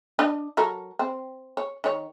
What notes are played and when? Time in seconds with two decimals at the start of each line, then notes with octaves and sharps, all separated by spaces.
0.19 D4 D#5
0.57 F#3 A4 A#4
0.99 C4
1.57 C#5
1.84 D#3 C#5